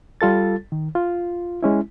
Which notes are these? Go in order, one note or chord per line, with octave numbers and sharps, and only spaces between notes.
G3 F4 A4 A6
D#3
F4
G#3 C#4 E4